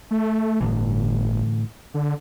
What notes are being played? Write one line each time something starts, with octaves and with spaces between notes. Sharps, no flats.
A3
G1 A2 D3 E3
D3